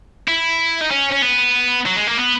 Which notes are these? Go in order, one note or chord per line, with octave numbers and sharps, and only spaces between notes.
E4
D#4
C#4
C#4
B3
F#3
G#3
A#3
B3